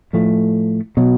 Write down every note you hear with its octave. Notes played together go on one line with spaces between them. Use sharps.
A2 F3 A3
B2 F#3